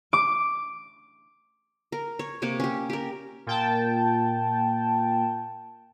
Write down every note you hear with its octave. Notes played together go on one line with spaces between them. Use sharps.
D6
A#4
C#5
C3 A#3 C#5 D6
C#4 G4
G4 A#4
A#2 G5 A5